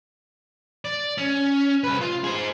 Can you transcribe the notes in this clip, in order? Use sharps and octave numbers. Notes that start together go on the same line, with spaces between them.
D5
C#4
C2 B4
F4
G#4 C5